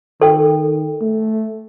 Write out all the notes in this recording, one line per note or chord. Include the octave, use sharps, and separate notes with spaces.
D#3 A4 G5
A3